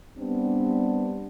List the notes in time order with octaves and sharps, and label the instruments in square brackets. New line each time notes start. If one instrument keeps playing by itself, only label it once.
[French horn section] G3 B3 C4 D4